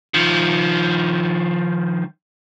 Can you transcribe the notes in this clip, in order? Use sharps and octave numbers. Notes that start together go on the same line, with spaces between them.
D#3 F3